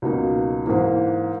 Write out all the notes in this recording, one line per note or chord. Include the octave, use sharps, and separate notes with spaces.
C#2 B2 F#3 A#3 D#4
G#2 E3 A#3